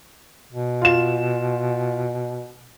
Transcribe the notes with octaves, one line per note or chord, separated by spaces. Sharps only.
B2
F4 E7